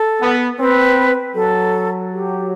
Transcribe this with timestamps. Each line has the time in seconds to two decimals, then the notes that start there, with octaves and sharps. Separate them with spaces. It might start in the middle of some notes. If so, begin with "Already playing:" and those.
Already playing: A4
0.20 B3
0.59 C4 B4
1.35 F#3 A4
2.12 G4